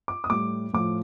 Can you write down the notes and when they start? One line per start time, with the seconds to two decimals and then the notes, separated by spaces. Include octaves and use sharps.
0.08 D6
0.24 D#6
0.30 A2 G3 D6
0.73 A2 F3 D6